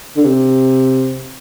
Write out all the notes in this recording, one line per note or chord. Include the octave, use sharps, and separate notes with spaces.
D3
C3